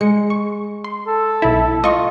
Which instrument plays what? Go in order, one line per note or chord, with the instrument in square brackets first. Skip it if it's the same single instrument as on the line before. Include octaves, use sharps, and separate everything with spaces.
[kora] G#3 [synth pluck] C#7
[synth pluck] C#6
C6
[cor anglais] A4
[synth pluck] B1 E4
[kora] F4 [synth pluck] D#5 C#6